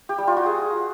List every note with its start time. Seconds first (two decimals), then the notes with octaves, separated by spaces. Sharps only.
0.09 G4
0.18 G3
0.27 F4
0.37 F#4
0.46 G#4